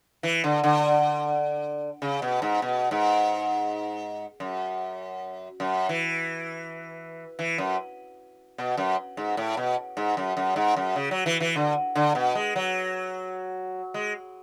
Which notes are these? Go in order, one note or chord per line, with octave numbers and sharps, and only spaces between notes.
E3
D3
D3
C#3
B2
G#2
B2
G#2
F#2
F#2
E3
E3
F#2
B2
F#2
G#2
A2
B2
G#2
F#2
F#2
G#2
F#2
C#3
F#3
E3
E3
D3
D3
B2
G#3
F#3
G#3